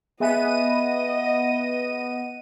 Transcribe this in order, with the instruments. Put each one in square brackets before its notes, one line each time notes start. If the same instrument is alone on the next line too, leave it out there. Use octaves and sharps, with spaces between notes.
[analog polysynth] B3 D#7 [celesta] G#4 E5 G#5 [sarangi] D#5